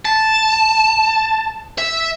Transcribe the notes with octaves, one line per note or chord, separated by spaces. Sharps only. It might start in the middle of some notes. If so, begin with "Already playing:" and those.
A5
E5